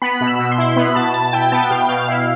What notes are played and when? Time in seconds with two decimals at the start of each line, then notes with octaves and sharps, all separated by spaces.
0.02 B3 B5
0.21 B2
0.27 E6
0.39 B2
0.51 C6
0.58 E4
0.76 B3 B5
0.95 B2 A5
1.14 B2 A5
1.33 E4 G5
1.52 B3 A5
1.60 G5
1.70 B2 F5
1.79 G5
1.89 B2 F5
2.08 E4